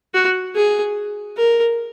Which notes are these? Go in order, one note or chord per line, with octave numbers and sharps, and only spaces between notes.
F#4
G#4
A#4